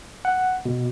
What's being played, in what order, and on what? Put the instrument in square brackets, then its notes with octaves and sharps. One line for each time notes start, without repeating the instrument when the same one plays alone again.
[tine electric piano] F#5
B2